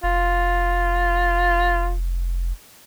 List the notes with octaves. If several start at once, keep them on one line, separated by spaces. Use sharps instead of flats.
F1 F4